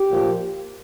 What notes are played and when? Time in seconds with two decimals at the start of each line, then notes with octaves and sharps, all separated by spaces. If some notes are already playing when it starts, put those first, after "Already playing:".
Already playing: G4
0.10 A#2 F3